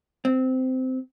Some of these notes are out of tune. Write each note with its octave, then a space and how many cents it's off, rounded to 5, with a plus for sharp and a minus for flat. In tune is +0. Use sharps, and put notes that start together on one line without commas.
C4 -15